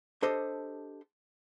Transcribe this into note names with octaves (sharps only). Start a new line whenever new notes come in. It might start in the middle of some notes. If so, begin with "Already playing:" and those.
D4 G4 A4 C5 D#5